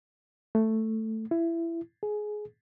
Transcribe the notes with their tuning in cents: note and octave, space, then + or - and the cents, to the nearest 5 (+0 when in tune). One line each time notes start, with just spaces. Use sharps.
A3 +5
E4 +20
G#4 +15